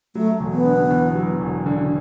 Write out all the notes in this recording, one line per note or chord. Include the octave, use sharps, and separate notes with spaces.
F#3 A3
E1
B3
D3
E2
F#3
E1
D3